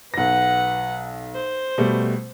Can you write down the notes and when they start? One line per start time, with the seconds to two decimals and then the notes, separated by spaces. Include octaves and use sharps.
0.14 B1 B4 F#5 A#6
1.35 C5
1.78 B2 G3 A3